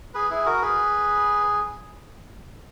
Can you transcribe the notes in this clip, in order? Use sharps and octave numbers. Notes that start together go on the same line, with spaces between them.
G#4 B4
E4 G#4
F#4 A#4
G#4 B4